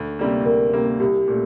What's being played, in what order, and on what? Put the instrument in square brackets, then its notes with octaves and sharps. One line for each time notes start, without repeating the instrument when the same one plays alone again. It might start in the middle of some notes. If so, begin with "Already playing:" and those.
Already playing: [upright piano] D2
C3 G3 A#3
[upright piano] D2 [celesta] A#4
[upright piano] C3 G3 A#3
[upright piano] C2 [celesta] G4
[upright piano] A#2 A3